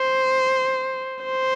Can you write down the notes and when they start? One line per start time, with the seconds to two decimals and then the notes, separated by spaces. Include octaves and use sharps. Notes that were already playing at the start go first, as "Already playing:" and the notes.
Already playing: C5
1.24 C5